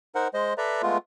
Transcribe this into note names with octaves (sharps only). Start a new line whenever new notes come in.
D#4 A#4 C5 F#5
G#3 C5 D#5
A4 B4 D5 E5 A#5
G#3 A3 B3 F4